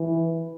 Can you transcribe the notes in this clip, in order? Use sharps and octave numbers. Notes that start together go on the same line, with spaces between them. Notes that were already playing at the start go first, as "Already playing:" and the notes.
Already playing: E3